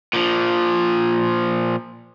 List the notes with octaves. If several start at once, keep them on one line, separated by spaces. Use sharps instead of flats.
A#2 F3